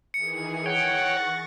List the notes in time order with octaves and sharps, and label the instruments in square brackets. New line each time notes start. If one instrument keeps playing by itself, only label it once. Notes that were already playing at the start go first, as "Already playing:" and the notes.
[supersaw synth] D#3 E3 G#4 [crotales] C#7
[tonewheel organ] C#5 G5 [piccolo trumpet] F#5 [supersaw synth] C#6 A6 A#6